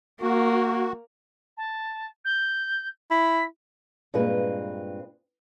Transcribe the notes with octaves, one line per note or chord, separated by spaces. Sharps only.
A#3 F#4
A5
G6
E4 B6
G2 A#2 G#3 C4 B4